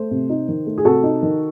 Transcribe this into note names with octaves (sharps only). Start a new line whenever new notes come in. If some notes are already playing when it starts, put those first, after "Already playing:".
Already playing: A3 C5
C3
D#4
D#3
A3
G#4
C3 F#4 A4
D#4
D#3